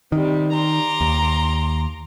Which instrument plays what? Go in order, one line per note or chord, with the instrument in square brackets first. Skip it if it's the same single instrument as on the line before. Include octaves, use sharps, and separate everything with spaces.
[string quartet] C3 G3 [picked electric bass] D#3
[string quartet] A#5 C6 D6
[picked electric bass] D#2